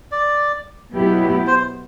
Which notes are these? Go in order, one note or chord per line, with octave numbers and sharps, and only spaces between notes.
D5
B2 F#3 B3 E4 G4
C5